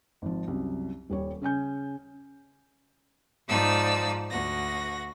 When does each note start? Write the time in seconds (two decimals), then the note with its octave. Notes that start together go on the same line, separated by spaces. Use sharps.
0.22 G#1 F3
0.47 C2 F#2
1.10 D#1 G3 C#5
1.42 C#3 C#4 G#5 G6
3.48 G#2 F3 D#4 D5 A5 E6
4.31 D2 F#4 A#6